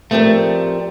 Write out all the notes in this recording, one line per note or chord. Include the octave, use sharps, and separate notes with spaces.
F3 A3 C4 G4 A#4 D5